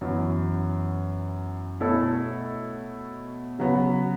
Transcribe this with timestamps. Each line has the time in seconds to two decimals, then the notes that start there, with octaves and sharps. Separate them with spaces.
0.01 F#2 E3 B3
1.80 B2 A3 E4 A4 C#5
3.59 C#3 F#3 B3 F#4 B4